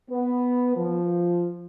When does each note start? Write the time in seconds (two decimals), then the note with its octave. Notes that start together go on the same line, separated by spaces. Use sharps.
0.10 B3
0.76 F3